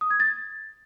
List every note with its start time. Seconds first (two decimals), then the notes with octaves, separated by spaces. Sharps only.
0.01 D#6
0.10 G#6
0.20 A6